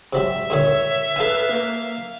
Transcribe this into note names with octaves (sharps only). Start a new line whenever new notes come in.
C3 F#3 G3 E5
G2 A#2 D3 C#5
A4 B4 F5 G#5
A#3